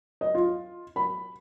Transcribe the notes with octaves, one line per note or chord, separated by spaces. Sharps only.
D#5
F4
B5